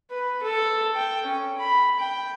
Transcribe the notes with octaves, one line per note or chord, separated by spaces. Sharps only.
B4
A4
G5
C#4
B5
G5